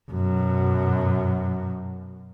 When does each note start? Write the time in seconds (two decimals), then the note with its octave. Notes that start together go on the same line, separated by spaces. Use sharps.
0.11 F#2 B2